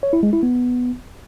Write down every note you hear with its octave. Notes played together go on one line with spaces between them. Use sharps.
C#5
E4
G#3
E4
B3